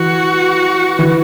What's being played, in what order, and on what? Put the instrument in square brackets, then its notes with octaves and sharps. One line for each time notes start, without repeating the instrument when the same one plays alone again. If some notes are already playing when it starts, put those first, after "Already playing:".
Already playing: [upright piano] E3 [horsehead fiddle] F#4
[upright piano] E3